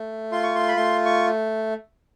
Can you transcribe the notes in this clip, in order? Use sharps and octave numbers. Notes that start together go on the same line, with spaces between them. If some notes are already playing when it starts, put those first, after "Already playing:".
Already playing: A3
F4 C6
C#6
C6
B5
A3 C6
C#6